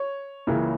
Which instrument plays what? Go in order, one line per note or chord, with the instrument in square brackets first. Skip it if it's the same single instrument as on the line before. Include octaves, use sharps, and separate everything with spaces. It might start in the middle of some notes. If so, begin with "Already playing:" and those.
Already playing: [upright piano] C#5
C#2 C#3 E3 A#3 C#4